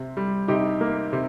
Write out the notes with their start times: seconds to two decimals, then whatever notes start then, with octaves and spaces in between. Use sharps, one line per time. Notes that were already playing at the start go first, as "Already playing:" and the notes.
Already playing: C3
0.17 G3
0.48 C3 D#4 G4
0.81 A#3
1.13 C3